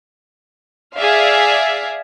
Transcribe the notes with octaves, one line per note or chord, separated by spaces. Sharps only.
G#4 D5 E5 F5